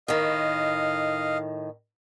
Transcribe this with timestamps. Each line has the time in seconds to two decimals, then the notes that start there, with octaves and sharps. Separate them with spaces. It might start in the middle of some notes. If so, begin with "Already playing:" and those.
0.08 A2 D#3 D#5 F5